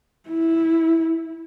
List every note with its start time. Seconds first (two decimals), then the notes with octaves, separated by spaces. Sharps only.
0.29 E4